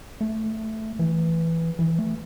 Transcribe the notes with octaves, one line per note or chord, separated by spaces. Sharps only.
A3
E3
E3
A3